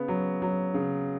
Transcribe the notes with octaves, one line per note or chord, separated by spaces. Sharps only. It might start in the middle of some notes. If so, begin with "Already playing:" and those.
Already playing: C#3 B3
F#3
F#3
C#3